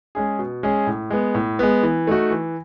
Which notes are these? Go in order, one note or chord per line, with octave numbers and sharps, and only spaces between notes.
G#3 C#4 G#4
B2
G#3 C#4 G#4
A2
G#3 B3
A2
G#3 B3
E3
A3 D#4 F#4
E3